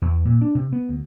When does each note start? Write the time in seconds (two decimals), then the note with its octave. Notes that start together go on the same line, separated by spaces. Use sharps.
0.02 E2
0.25 A#2
0.41 D4
0.55 C3
0.73 B3
0.89 D2